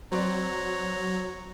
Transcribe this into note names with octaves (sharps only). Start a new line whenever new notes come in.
F#3 C4 B4 C#5 D5 A#5